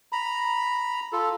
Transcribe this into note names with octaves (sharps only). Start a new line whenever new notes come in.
A#5 B5
F4 A4